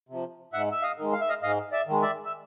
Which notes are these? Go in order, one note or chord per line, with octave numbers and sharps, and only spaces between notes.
C3 F3
G#2 E5 F#5
E5
D#5 F5
D#3 G#3
F5
E5
D#5 F5
G#2 D#5 F5
D5 E5
D#3 G#3
D5 E5
E5